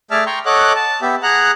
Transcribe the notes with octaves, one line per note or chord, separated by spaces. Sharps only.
A3 G#4 D5 E5 A5 F6
G5 A#5 C6 C#6
A4 C#5 D#5 F#5 D6 F#6
A5
B3 G4 E5
G#4 F#5 A#5 F#6